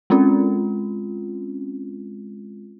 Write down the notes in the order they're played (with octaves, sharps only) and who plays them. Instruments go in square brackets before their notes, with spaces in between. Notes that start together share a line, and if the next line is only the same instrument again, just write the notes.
[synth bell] G#3 C4 C#4 F4